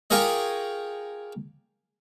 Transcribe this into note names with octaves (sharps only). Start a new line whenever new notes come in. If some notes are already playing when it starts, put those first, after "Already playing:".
F4 G4 G#4 A#4 C#5 D#5